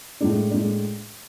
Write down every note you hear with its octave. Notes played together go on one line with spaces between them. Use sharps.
A2 G#3 D4
A2 G#3 D4